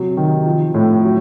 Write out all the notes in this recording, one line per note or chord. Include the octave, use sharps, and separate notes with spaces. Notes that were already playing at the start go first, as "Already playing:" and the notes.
Already playing: C3 F#3
D#3
F3
A2
F#3